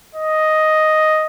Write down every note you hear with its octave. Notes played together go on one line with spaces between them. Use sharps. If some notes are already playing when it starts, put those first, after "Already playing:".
D#5